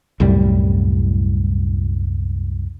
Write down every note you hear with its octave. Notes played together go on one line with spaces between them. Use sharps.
C2 F#2 A2 G3